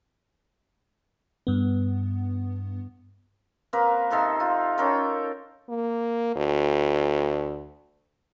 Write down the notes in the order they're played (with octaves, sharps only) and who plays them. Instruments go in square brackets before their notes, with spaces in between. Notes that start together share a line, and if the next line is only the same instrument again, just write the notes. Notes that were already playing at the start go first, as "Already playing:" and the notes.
[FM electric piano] G2 B3
[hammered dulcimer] A#3 C4 A#4 B4
C3 D#4 A4 C6
F4
C#4 A4 A#4 G5
[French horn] A#3
D2